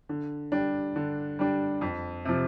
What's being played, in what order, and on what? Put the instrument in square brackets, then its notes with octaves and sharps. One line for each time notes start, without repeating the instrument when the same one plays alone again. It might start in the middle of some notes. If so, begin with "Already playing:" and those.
[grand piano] D3
G3 D4
D3
G3 D4
F2
C3 F3